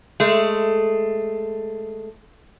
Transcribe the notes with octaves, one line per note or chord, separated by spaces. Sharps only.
G#3 A3